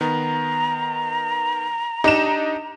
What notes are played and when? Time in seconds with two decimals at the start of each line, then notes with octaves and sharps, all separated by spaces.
0.01 D#3 B3 A#5
2.04 D4 D#4 G4 D#5 E7